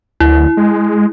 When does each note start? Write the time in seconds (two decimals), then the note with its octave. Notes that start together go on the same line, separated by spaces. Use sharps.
0.20 D2 E4
0.57 G#3